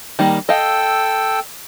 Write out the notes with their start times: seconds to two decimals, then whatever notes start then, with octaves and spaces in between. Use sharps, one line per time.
0.19 D#3 G3 A#3
0.49 A4 D#5 F5 G5 E6